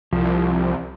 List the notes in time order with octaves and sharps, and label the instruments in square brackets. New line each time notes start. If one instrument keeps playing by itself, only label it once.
[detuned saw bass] C2 [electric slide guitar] F3